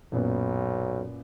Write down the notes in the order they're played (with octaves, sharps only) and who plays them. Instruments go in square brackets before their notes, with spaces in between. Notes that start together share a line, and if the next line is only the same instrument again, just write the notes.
[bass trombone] B1 [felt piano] F#2 A#2 B3